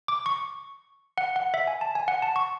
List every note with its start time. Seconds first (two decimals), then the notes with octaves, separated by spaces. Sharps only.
0.08 D6
0.26 C#6
1.18 F#5
1.36 F#5
1.54 E5
1.67 G#5
1.81 A5
1.95 G#5
2.08 F#5
2.22 A5
2.36 C#6